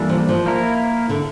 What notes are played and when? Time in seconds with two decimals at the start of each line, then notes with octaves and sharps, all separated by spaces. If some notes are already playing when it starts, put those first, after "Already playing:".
Already playing: E3 G3 A#3 D4 A4
0.09 F3
0.29 F3
0.46 A#3 E4 A#4
1.09 D3